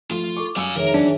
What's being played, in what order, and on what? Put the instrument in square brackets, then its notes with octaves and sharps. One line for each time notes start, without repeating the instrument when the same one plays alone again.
[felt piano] F3 A3 [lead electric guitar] F4
[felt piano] A4 C#6 [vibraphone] D6
[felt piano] F#2 E6 C#7 [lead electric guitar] F5 G#5
[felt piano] F1 D#3 [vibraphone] G#4 C#5 E5 [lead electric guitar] A#4
[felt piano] F#2 D#3 [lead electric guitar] E3 [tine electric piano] D4